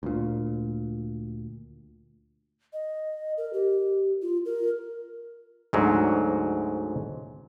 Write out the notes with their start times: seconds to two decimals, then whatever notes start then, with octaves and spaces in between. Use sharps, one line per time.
0.03 D2 A#2
2.73 D#5
3.37 A#4
3.53 G4
4.22 F4
4.45 A#4
5.73 D2 G#2 F#3